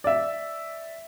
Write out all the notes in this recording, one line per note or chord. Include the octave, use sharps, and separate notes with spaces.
D5 E5